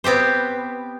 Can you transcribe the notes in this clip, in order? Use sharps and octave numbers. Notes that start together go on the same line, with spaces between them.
B3 C4 G4 C5